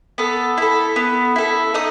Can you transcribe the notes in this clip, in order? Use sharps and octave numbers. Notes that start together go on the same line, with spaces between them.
B3 A4 A5
E4 A4
B3
E4 A4
D#4 D#5 D#6